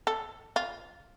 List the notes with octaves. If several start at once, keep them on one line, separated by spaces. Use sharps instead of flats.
A4
F4